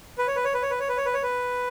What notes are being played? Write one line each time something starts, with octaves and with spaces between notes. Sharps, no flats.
B4
C#5
B4
C#5
B4
C#5
B4
C#5
B4
C#5
B4
C#5
B4